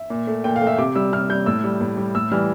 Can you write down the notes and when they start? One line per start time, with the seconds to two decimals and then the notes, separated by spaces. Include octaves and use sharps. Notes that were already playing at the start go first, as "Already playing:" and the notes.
Already playing: E5
0.10 A#2
0.27 A3
0.44 A#2 G5
0.56 F5
0.62 A3
0.67 E5
0.78 C3 D6
0.95 G3 E6
1.12 C3 F6
1.29 G3 G6
1.46 A2 E6
1.64 G3
1.81 A2
1.97 G3
2.15 A2 E6
2.31 E3 G3 F6